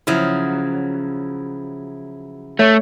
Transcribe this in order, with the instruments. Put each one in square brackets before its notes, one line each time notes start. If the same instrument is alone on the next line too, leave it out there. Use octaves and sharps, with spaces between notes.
[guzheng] C#3 F3 F#3 [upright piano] E4
[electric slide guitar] A3 [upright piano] C#5